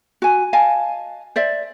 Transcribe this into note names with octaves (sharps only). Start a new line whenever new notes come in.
F#4 G#5
D#5 F5 G#5 A5
C5 D5 E5